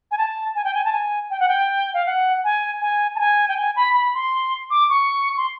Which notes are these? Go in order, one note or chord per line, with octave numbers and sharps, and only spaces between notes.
G#5
A5
G#5
G5
G#5
A5
G#5
G5
F#5
G5
F5
F#5
G#5
G#5
A5
G#5
G5
G#5
B5
B5
C6
D6
C#6
C6